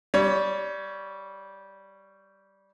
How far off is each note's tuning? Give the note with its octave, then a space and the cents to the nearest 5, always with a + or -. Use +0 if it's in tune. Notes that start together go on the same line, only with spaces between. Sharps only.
G3 -10 C#5 +15